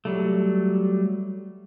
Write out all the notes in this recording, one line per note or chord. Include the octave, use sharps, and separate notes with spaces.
F#3 G3 A3